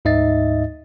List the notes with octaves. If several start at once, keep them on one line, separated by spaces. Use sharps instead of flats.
D2 G#2 D#4 D#5 E5 A6